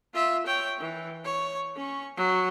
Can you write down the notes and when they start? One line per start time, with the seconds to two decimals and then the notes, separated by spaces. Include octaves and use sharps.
0.14 F4 E5
0.46 C#5 G5
0.80 E3
1.24 C#5
1.76 C#4 C#6
2.17 F#3